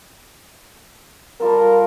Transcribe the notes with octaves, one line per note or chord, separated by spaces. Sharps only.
G3 F4 A4 A#4